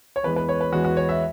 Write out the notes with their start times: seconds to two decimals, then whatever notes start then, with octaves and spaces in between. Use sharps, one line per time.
0.16 C#5
0.24 E2 E3 G#3 B3 B4
0.36 B4
0.49 C#5
0.61 B4
0.72 E2 E3 G#3 B3 F#4
0.84 F#4
0.97 C#5
1.09 E5